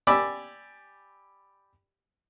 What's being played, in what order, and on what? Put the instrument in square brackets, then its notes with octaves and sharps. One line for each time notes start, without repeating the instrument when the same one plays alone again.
[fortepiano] G4 D5 G#5 B5 D6 E6